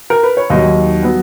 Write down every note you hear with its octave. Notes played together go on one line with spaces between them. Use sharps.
A#4
B4
C#5
D#2 D#3 F#3 D#5
F#3 B3